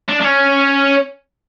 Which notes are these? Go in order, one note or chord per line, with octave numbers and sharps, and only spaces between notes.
D4
D4
C#4